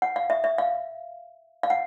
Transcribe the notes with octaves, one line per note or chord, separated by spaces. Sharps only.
F#5
F5
E5
E5
F5
F5
F#5